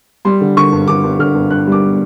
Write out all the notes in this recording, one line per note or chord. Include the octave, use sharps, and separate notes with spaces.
G3 C6
D3
D3 C#6
G2
D3 D6
G2
D3 F6
G2
G2 F#6
G3 D6